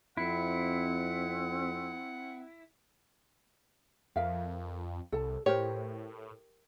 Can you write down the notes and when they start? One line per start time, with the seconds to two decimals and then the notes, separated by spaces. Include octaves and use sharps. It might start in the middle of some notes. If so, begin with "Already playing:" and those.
0.17 F2 C4 E4 F#5
4.16 F2 A#4 E5 F5
5.12 C2 A4 A5
5.46 A2 G4 A#4 C5 C#5